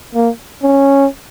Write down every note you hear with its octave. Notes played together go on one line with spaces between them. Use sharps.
A#3
C#4